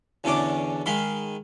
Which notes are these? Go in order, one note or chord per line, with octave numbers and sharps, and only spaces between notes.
E2 B2 D3 C#4 D4 D6
D#3 G#3 F5 B5 C6